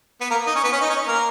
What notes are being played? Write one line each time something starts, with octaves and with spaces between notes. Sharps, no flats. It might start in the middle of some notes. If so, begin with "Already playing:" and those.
B3 B4
A#3 A#4
D#4 D#5
C#4 C#5
B3 B4
C#4 C#5
D#4 D#5
C#4 C#5
A#3 A#4